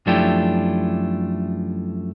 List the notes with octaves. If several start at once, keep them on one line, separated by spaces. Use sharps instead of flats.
F#2 F3 A3 D4 E4 G4